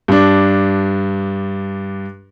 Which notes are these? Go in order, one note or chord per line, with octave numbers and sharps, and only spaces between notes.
G2 D4